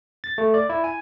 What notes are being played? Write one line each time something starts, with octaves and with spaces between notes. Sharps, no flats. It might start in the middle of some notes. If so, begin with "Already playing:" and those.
A6
A3
D5
E4
G#5